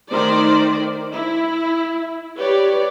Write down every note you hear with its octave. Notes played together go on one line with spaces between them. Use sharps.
D#3 A3 A#4 C5 D5
E4
G4 B4 C#5 D5